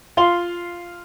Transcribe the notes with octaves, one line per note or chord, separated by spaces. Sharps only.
F4 F5 C6 G7